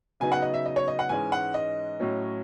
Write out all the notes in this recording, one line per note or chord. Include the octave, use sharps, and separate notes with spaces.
C#3 F#3 B3 D#4 G#5
F#5
D#5
E5
D#5
C#5
D#5
F#5
G#2 E3 G#3 C#4 G#5
F#5
D#5
A2 F#3 C#4